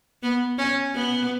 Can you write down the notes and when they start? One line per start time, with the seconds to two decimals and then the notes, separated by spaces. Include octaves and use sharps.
0.23 B3
0.58 C#4
0.94 B3